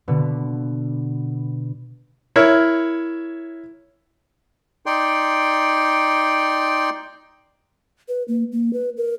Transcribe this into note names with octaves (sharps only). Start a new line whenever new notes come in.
B2 D3 B3
E4 A#4 C#5
D#4 D5 G5 C6
B4
A#3
A#3
B4
A#4